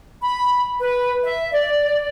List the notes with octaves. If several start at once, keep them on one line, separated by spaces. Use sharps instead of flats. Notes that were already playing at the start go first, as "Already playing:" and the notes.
B5
B4
E5
D5